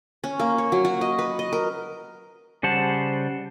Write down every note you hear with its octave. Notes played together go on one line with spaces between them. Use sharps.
C#4
A#3
C#5
F#3
F#4
D#5
B4
D#5
A#4
C#3 G3 C5 F#5 A5